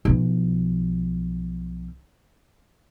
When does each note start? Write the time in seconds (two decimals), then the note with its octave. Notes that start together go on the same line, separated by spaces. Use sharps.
0.05 B1 F3